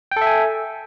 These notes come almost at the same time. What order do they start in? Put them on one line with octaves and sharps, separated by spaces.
G5 A4 E5 G#5